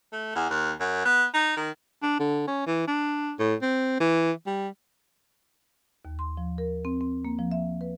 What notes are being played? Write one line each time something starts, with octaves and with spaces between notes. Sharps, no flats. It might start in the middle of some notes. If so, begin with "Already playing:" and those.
A3
E2
D#2
F#2
B3
D#4
D#3
D4
D3
C#4
E3
D4
A2
C4
E3
G3
D#2
C6
F3
A#4
C4
C4
A#3
F3
E5
B4